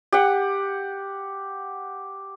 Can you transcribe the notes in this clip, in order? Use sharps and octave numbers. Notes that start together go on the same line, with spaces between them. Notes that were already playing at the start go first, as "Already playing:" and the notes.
G4 F#5